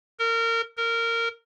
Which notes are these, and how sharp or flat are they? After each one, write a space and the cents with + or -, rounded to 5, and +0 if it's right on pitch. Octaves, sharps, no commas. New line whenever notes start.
A#4 -25
A#4 -15